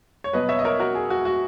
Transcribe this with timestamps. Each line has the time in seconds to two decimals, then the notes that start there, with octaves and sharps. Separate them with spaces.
0.24 C#5
0.33 B2 F#3 B3 B4 D#5
0.49 C#5 E5
0.59 D#5
0.65 A#4 C#5
0.79 F#4 A#4
0.95 G#4
1.10 F#4
1.25 F#4